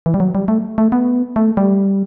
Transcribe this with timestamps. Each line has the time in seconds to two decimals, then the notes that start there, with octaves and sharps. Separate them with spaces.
0.06 E3
0.14 G3
0.20 F#3
0.35 G3
0.48 A3
0.78 A3
0.92 B3
1.36 A3
1.57 G3